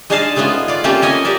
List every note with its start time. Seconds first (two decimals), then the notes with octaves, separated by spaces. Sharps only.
0.10 G#3 D4 D#4 G#4 F5 A5
0.36 G#3 A3 B3 C#4 F4
0.68 F4 D5
0.84 A3 A#3 C4 C#4 F4 G4
1.02 A#3 C#4 D#5 G#5
1.25 G4 A#4 D5 E5